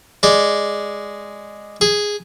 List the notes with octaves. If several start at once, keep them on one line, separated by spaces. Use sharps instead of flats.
G#3 D5
G#4